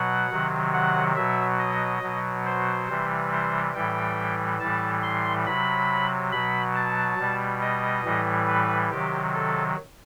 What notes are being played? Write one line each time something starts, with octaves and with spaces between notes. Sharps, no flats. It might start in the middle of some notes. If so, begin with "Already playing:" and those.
Already playing: B2 F#3 F#5
C3 D#3 F#3
F#5
B2 F#3 E5
D#5
B2 F#3
C5
C3 E3 G3
C5
A2 E3 G3 G5
A2 E3 G3 A5
C6
C3 F#3 B5
B2 F#3 B5
A5
B2 G3
D#5
A2 E3 G3
B4
C3 D#3 F#3 G4
A4